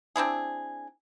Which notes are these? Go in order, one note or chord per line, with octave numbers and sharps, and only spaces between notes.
C4 D4 E4 G#4